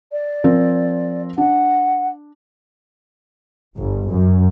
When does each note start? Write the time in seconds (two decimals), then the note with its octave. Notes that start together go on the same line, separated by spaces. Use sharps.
0.12 D5
0.44 F3 C4 A#4
1.38 D4 F#5
3.77 G1
4.09 F#2